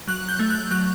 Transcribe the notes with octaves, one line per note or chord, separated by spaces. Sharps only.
F#3 F#6
G6
A3
F#6
F#3 F#6